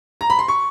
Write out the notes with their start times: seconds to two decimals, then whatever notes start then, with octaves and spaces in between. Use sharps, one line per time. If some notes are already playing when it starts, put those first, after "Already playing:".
0.21 A#5
0.30 B5
0.39 C6
0.48 C#6